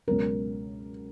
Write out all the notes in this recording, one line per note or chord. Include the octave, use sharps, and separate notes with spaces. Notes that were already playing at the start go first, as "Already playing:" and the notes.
C#2 B2 F#3 A#4